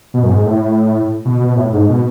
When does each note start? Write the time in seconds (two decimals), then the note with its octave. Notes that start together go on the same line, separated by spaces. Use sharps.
0.14 B2
0.23 F#2
0.30 G#2
0.46 A2
1.25 B2
1.41 B2
1.57 A2
1.73 G#2
1.89 B2